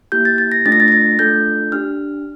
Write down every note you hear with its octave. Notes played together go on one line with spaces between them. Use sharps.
A#3 E4 G4 G6
A6
A6
A#6
A3 D4 F4 A4 A6
A#6
A6
A#6
A6
A3 D4 F4 A4 G6
D4 G4 F6